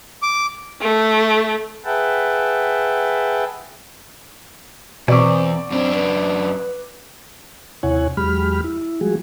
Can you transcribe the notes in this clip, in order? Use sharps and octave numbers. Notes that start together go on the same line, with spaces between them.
D6
A3
G#4 B4 E5 F#5 G5 A5
E2 B2 C4 D5 C#6 D6
F#2 C4 D4
B4
D#2 C3 E4 C#5 F#5 G#5
E2 F#3 G#3 G4 B5 F6
E4
F3 G3 G#3 F#4 G#4